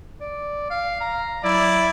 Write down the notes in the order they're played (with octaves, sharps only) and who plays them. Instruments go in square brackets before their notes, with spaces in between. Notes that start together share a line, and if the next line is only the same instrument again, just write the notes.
[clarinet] D5
F5
A#5
[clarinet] F#3 [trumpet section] E4 D5